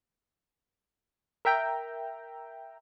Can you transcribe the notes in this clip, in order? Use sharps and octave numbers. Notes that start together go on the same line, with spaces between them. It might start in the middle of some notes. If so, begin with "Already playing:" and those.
A#4 E5 G5 A#5